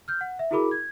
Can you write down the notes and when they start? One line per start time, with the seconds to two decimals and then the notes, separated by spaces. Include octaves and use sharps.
0.08 F6 G6
0.21 F#5
0.39 E5
0.51 E4 F#4 G#4 A#4 B5 D6
0.71 G#6